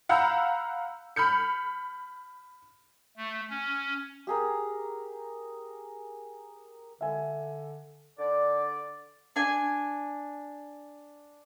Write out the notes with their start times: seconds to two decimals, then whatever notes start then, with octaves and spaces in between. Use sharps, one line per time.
0.09 F5 F#5 A#5 B5 E6 G6
1.16 B5 F6 G6 C#7
3.17 A3
3.50 C#4
4.27 G4 G#4 A#4
7.01 D3 E5 G#5
8.19 D3 D5
9.36 D4 G#5